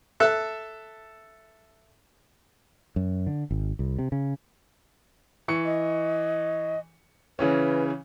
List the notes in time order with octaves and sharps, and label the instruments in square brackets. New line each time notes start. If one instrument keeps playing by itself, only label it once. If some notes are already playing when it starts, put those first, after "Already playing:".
[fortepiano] A4 E5 A5 F#6
[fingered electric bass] F#2
D3
G#1
C2
C3
C#3
[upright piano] E3 C#6 C#7
[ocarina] D#5
[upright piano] C#3 E3 C#4 [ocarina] B4